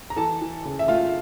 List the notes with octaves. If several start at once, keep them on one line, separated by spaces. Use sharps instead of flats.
A#5
E3 A4 A5
E3
C#3
E5
A3 F4 F5